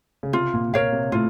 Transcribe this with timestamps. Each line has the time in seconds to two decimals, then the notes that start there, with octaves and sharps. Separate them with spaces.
0.23 C#3
0.33 C3 F4
0.54 A#2
0.73 A#2 A#4 C#5 F5
0.92 C3
1.12 A2 F4